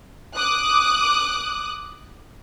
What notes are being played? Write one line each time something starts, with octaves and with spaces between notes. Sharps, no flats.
D6 D#6 F#6